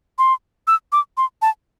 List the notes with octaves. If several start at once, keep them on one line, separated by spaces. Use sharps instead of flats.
C6
E6
D6
C6
A5